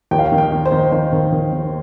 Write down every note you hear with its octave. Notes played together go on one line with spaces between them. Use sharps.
D#2 G5
F5
G5
D#3
G5
D#3
C5
D#3
D#3 C5
D#3
D#3
D#3